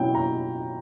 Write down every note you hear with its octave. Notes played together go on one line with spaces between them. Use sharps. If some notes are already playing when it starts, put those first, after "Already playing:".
Already playing: B2 F#3 C#4 E4 G5
A#5